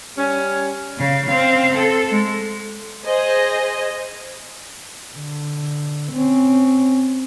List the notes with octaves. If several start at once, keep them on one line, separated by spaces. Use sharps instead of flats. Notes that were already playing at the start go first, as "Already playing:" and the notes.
G3 C#4
C#3 F5
C4 F5
A4
G#3
G#4 C5 D#5
D3
C4 C#4